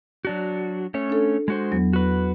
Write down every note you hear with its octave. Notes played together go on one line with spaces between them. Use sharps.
F#3 D4 F#4
A3 C#4 C#5
D4 A4
G#3 F#4 C5
E2 F#3 B3
F#4 B4